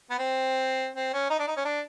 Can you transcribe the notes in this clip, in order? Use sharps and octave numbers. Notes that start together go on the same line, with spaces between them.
B3
C4
C4
C#4
D#4
D4
D#4
C#4
D4